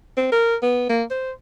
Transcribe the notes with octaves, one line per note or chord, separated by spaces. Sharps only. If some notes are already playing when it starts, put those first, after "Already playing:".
C4
A#4
B3
A#3
C5